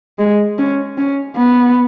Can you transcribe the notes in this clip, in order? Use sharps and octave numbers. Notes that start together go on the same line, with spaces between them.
G#3
C#4
C#4
B3